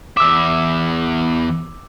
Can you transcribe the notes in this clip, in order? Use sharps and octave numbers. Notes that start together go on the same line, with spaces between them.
E2 E5 D6 E6